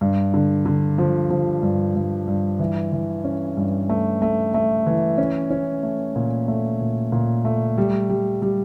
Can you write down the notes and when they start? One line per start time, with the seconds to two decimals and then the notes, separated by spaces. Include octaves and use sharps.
0.01 G2
0.34 D3
0.65 D3
0.98 F3
1.30 F3
1.63 G2
1.96 G2
2.27 G2
2.59 E3
2.92 E3
3.24 C#4
3.57 G2
3.89 A3
4.22 A3
4.54 A3
4.86 E3
5.18 C#4
5.50 C#4
5.83 A3
6.16 A#2
6.48 A3
6.81 A#2
7.12 A#2
7.45 A3
7.78 G3
8.09 G3
8.42 G3